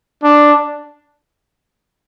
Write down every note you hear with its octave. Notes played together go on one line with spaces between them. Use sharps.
D4